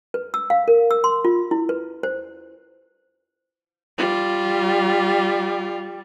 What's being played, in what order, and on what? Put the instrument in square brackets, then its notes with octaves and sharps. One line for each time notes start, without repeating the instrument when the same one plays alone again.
[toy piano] B4
E6
F5
A#4
E6
C6
F4
E4
B4
C5
[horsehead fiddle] G3 [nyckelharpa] F4